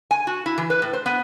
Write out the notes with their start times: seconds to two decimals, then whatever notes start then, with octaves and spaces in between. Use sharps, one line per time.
0.11 G#5
0.27 F#4
0.46 E4
0.58 E3
0.70 B4
0.82 A2
0.93 C5
1.06 B3